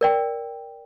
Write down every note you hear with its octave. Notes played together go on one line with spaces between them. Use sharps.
A#4 D5 G5